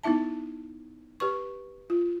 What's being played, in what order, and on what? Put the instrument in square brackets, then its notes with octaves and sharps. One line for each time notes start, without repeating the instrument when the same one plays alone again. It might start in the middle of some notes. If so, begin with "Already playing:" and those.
[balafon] B3 D#4 E4 E5 A5
G4 B4 C#6
F4